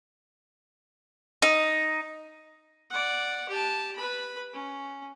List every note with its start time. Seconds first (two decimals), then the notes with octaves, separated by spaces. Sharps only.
1.42 D#4
2.90 D5 F#5
3.48 G4 A5
3.96 B4 B5
4.53 C#4